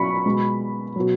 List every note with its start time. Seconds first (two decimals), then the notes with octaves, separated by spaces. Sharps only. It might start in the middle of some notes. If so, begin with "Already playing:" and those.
Already playing: B2 F#3 B5 C#6
0.26 B2 G#3
0.96 B2 F#3